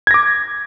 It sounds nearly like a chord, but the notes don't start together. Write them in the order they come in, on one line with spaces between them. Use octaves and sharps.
G#6 A#6 D6